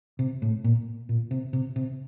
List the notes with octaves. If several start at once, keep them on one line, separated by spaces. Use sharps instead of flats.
C3
A2
A#2
A#2
C3
C3
C3